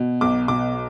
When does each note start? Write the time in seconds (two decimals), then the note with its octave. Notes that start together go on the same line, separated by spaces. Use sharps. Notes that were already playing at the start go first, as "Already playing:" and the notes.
Already playing: B2
0.21 B1 D6
0.48 B2 D6